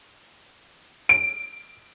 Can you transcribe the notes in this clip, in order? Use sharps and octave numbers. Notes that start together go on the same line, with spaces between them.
D7